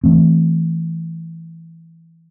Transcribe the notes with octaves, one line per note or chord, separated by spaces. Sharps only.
E3 A3 C4